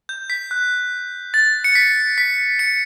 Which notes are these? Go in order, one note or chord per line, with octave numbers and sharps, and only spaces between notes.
G6
B6
F#6
A6
C#7
B6
B6
C#7